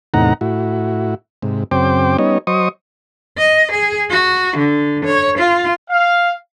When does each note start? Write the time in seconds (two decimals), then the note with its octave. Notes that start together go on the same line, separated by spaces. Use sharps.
0.14 E2 A2 C3 D#4 F#5 A#5
0.41 A2 E4 F#4
1.42 G#2 C3
1.71 F#2 C#3 C4 C5 G5 D6
2.18 G3 B3 C#4 D#4 C#5 D#5
2.47 F#3 C5 D#5 C#6 D#6
3.38 D#5
3.72 G#4
4.11 F#4
4.57 D3
5.05 C#5
5.38 F4
5.90 F5